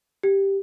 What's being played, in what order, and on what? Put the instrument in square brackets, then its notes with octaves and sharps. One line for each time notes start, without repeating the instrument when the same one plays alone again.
[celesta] G4